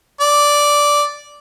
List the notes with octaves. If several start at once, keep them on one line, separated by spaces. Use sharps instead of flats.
D5